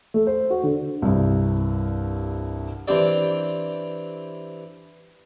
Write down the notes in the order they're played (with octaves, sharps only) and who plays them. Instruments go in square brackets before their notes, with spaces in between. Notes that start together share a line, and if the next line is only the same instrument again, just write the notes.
[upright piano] A3
C5
F#4
D3
[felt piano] C2 G2
[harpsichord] E3 C4 D4 G4 D5